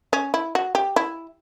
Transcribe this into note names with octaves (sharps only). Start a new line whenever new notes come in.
C#4
E4
F#4
G4
E4